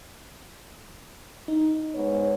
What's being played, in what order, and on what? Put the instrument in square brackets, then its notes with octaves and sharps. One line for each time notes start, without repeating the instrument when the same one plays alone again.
[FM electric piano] D#4
[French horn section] G#2 B3 C#5